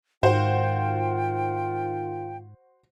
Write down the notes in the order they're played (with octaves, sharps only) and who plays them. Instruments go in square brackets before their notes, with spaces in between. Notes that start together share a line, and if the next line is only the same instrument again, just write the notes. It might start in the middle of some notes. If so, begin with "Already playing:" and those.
[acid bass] G#2 [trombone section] D#3 F4 [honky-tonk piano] F#4 C5 [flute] G5